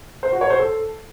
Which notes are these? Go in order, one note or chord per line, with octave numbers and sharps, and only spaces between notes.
C5
F#4
C#5
C5
A4